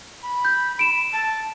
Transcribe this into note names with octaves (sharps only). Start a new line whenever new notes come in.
B5
G6
D7 E7
A5